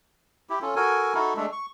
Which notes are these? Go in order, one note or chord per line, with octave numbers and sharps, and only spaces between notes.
E4 G4
C#4 F4 A4
F#4 A4 A#4 G#5
D#4 E4 F#4 A4
G#3 A3 D4 A4
C#6